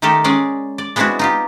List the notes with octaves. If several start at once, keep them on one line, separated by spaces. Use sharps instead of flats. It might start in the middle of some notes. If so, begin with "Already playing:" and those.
D#3 A3 D#4 G4 A4 A#4
G#3 C#4 G#4 D5
D5
G#3 B3 C4 D4 E4 F#4
D#4 F4 G4